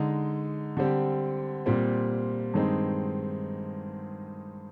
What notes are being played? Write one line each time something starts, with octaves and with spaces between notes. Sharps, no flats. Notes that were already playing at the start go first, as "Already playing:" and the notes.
Already playing: D3 G#3 D#4
D3 G3 C4 G4
A#2 G3 C4
G2 D#3 G#3 C4 D#4